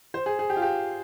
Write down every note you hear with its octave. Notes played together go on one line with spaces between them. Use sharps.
C5
G#4
G#4
G4
F4
G4